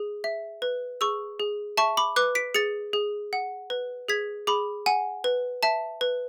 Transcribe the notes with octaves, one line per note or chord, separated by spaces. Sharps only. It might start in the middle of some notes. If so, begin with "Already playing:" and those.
Already playing: G#4
E5
B4
G#4 C#6 E6
G#4
E5 A5 C#6
B5 D6
B4 D6 F#6
B6 D7
G#4 A6 C#7
G#4
F#5
B4
G#4 G#6 B6
G#4 B5 D6
F#5 G#5
B4
E5 A5
B4